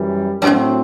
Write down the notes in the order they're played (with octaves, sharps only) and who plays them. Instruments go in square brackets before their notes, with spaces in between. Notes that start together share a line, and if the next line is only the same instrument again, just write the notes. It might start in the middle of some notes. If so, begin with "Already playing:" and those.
Already playing: [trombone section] F#2 E3 G3
[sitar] F#2 [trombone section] A2 F#3 C4 F#4